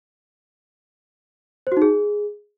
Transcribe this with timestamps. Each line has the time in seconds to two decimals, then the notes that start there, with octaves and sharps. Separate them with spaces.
1.67 C5
1.72 F#4
1.77 D#4
1.82 G#4